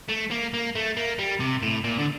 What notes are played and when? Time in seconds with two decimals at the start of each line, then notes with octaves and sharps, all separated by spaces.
0.09 A3
0.31 A#3
0.54 A#3
0.75 A3
0.97 A#3
1.19 G3
1.40 C3
1.62 A2
1.84 A#2
1.98 D3